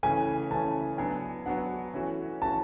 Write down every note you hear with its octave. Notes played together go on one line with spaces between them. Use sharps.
C#3 E3 A3 C#4 G#5
C#3 E3 A3 C#4 A5
F#3 B3 D4 G#5
F#3 B3 D4 F#5
E3 A3 C#4 F#4
E3 A3 C#4 F#4 A5